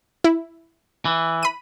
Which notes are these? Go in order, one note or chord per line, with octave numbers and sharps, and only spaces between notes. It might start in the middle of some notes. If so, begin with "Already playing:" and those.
E4
E3
B5 D#7